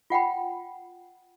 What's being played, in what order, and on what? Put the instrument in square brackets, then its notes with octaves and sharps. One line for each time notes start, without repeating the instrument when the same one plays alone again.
[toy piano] F4 F#5 G5 B5